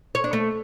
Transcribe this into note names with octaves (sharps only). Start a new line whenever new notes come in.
C#5
D4
A3